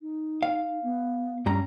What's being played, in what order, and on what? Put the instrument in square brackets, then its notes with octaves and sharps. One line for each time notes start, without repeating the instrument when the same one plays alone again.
[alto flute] D#4
[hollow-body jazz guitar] F5
[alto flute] B3
[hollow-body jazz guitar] G2 G3 A#5 [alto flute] C#4